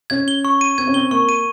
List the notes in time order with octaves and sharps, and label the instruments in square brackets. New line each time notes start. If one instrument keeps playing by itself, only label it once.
[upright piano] C#4 [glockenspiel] G#6
[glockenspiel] G7
C#6
D#7
[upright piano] C4 [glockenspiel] G#6
[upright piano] C#4
[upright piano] C4 [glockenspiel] G7
[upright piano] A#3 [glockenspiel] C#6
[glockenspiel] D#7